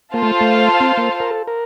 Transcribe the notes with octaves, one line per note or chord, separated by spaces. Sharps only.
A#3 F4 A4 C5 F5 A5
A3
A3
C4
A#3
A#4
A4
A#4